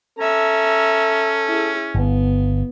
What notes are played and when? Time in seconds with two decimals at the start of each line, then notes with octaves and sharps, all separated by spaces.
0.19 C#4 A4 E5 A#5
1.47 E4 G#4
1.95 G1 B3